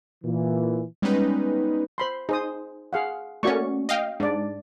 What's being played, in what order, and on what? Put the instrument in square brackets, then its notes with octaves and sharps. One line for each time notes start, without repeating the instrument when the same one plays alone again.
[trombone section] A#2 E3
[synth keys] G3 G#3 B3 C#4 D#4 B4
[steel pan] C5 B5 C6
[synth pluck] D#4 [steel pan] G#4 C5 D#6
[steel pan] G#4 F5 F#5
[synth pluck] A3 A#3 C#4 [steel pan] F#4 D5 C#6
[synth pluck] D#5 F5 G5
[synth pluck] G#2 [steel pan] D4 D5